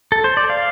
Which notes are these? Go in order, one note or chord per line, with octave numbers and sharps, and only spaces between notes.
A4
C5
D5
F5